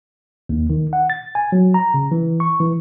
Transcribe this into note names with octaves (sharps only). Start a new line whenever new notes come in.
D#2
D#3
F#5
A6
G#5
F#3
A#5
C#3
E3
C#6
E3